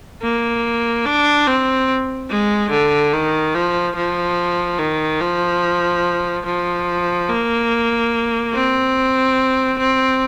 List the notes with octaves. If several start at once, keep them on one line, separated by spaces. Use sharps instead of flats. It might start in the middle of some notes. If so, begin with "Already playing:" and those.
A#3
D4
C4
G#3
D3
D#3
F3
F3
D#3
F3
F3
A#3
C4
C4